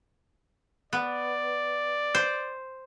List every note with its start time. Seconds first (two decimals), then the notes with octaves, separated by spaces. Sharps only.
0.93 B3 D5
2.15 C5